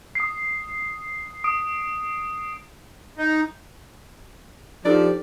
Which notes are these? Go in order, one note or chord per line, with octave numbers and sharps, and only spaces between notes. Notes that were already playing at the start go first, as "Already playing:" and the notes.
D#6 C7
D#6 D7
D#4
F3 D4 D#4 G4 A4 D5